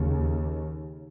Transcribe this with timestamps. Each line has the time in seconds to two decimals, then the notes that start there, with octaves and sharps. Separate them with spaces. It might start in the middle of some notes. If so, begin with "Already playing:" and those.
Already playing: D#2 C#3